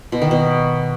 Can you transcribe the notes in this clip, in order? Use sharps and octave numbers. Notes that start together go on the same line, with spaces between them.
B2
D#3
B2